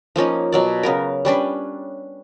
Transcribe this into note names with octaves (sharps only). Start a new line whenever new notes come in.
F3 A#3 C#4 D#4
B2 F#3 D5
C#3 B3 A#4
G3 C#4 D4 B4